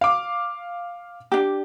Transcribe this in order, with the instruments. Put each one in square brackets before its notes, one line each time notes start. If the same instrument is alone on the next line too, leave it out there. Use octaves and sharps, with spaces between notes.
[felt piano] F5 D6
[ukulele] D4 G4